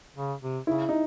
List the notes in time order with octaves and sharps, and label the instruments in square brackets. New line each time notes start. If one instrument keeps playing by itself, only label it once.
[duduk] C#3
C3
[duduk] C#3 [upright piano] E4
[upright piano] D#4